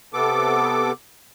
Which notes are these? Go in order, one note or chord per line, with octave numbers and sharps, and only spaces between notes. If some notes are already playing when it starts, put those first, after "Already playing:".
C3 B3 A4 D6